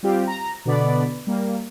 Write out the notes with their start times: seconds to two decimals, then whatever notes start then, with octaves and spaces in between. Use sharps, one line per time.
0.03 G3 C4 F4 G4
0.27 A#5
0.65 B2 D3 B3 D5 B5
1.27 G3 A#3